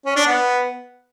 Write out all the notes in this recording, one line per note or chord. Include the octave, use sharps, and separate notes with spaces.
C#4
D4
B3